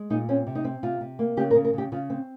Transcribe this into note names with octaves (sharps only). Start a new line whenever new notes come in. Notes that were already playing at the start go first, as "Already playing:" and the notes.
Already playing: G#3
A#2 D#4
C4 C#4
C3
D#4
C4
C3 F4
C3
A#3
C#3 G4
A#4
C#3
A#4
C#3 G4
C#3 F4
C4